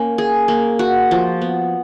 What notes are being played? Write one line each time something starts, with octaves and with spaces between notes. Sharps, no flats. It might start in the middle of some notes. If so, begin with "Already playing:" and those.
Already playing: A#3 C#4
G#4
A#3
F#4
F3
B3